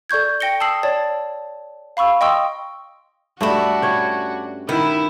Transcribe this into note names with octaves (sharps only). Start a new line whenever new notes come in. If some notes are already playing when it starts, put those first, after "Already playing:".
A4 D5 C#6 G6 G#6
G5 A#6 C#7 G7
A5 D#6 E6 C7 F#7
C#5 D5 A5
F5 B5 C#6 E6
D#5 G5 C6 C#6 D#6 E6
G2 A3 D4 E4 F#4
C#4 C#5 G5
D#3 B3 E4